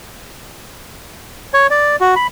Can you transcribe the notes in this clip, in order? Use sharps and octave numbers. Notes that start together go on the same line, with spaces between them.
C#5
D5
F#4
B5